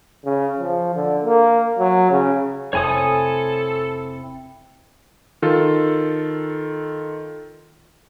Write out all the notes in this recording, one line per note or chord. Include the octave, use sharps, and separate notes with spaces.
C#3
F3
D3
A#3
F#3
C#3
F1 C4 E4 A4 C#5 G#5 D#6
D#3 F4 A4